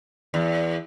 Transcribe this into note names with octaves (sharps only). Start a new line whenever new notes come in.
E2